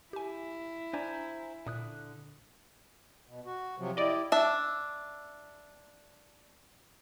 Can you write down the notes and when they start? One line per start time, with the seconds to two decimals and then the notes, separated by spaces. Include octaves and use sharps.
0.13 E4 G4 G#5
0.93 D4 C5 D5 G#5 A#5
1.67 A#2 D3 D#6 F#6
3.27 B2
3.46 F#4
3.78 C3 F3 F#3
3.97 E4 G4 D5 D#5
4.32 D4 E5